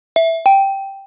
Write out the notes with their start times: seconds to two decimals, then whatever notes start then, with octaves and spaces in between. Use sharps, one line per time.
0.16 E5
0.46 G5